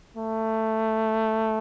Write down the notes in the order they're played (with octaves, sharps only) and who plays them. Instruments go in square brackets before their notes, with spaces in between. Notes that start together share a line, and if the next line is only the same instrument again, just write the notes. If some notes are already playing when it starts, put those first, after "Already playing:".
[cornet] A3